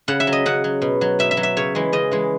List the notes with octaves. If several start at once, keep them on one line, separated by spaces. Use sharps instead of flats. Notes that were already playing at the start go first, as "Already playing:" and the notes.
C#3 F#5
E5
F#3
D#5
C#3 F#5
F#3
B2
F#3
B2 E5
E5
F#3
E5
C#3 C#5
E3 G#3
C#3 D#5
E3 G#3